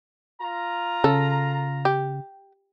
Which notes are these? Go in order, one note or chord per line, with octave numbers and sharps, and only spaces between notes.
F4 A#5
C#3 A4
G4